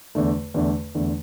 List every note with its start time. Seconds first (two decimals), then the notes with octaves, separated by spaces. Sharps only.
0.15 E2 D3 A3
0.54 E2 D3 A3
0.95 E2 D3 A3